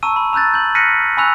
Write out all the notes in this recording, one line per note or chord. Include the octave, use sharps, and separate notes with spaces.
A5 A#5 C#6 E6 D#7
B5
A#5 E6 F#6 G6 A6
G6 F#7
F6 F#6 A#6 B6 C#7 D#7
G#5 B5 C#6 E6 F#6 F7